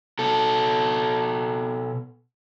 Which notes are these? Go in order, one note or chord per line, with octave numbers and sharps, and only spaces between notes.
B2 A4